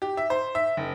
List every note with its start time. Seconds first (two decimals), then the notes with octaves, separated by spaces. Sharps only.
0.02 G4
0.17 E5
0.30 C5
0.55 E5
0.77 F#1